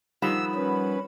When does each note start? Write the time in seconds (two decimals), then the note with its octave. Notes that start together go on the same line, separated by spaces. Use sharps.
0.22 D#3 F3 G3 F#5 B5 E6
0.55 C#4 B4